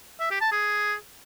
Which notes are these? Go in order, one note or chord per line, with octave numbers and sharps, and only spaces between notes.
E5
G4
A5
G#4